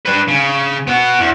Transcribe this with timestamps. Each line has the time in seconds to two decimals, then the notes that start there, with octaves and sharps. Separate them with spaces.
0.05 D4 B4
0.28 C#3
0.87 B3 F#4
1.19 E2